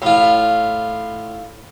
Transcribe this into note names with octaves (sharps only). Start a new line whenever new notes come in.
A2 F4